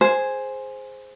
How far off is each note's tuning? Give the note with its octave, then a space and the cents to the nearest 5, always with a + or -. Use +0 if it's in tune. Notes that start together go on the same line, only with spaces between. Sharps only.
G#4 +0 C5 +0